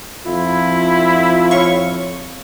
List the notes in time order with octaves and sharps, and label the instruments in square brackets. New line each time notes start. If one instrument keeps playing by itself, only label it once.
[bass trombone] F2 [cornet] E4 [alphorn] F4
[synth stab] C#5 F5 C#6